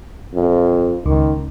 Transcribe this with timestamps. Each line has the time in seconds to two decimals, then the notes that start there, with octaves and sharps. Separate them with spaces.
0.34 F2
1.06 C#2 D#3